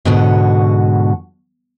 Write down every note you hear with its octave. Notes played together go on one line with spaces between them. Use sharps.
G#2 B2 D3 F#4